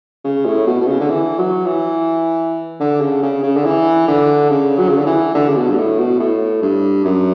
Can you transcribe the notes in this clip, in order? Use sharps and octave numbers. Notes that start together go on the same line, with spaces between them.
C#3
A2
B2
B2
C#3
D3
E3
F#3
E3
D3
C#3
C#3
C#3
D3
E3
D3
C#3
F#3
C#3
D3
E3
D3
C#3
B2
G2
A2
B2
A2
G2
F#2